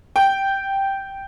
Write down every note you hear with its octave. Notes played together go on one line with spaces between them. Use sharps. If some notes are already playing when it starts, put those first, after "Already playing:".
G5